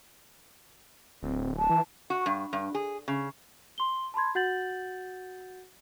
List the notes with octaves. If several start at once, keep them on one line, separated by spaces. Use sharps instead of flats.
D1 C4
A5
E3
F#4
G2
G2
G#4
C#3
C6 G7
A5 B5 C6 G#6
F#4 F#5 G6 A6 F#7